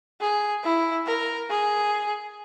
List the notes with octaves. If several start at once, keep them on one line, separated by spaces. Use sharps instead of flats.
G#4
E4
A#4
G#4